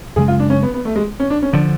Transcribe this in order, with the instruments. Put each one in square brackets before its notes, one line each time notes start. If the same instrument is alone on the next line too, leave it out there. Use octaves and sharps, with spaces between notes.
[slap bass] F#2 C#3 G#3 [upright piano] G#4
[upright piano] F4
D4
C#4
B3
B3
A3
G#3
C#4
D4
C#4
[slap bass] D3 F3 [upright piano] D4